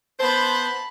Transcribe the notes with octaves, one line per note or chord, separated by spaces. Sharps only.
B3 C5 A5 B5